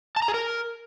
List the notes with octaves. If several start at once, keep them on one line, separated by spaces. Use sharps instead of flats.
A5
A#5
G#4
A#4